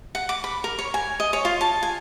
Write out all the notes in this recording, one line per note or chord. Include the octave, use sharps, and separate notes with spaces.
F#5
D6
B5
A#4
C#5
G#5
D#5
C#5
F4
A5
G#5